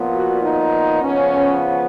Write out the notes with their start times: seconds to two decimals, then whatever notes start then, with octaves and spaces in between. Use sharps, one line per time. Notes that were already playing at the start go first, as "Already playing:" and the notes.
Already playing: A#2 F3 B3
0.11 F#4
0.41 D#4
1.02 C#3 F3 B3 C#4